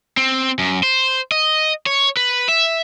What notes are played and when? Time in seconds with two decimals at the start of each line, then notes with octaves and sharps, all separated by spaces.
0.17 C4
0.59 F#2
0.83 C5
1.32 D#5
1.86 C#5
2.17 B4
2.49 E5